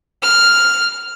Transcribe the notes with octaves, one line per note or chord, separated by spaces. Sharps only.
F6